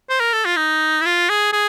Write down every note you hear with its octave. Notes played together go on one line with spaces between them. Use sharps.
C5
A#4
A4
F4
D#4
E4
F4
G#4
G#4